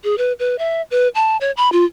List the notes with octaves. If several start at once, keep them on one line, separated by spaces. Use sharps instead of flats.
G#4
B4
B4
E5
B4
A5
C#5
B5
F4